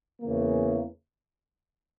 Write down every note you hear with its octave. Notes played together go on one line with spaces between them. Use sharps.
E2 C#3 E3 A#3